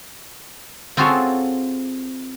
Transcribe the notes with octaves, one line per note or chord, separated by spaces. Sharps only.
C4 F4 F#4 G#4 A4 C#5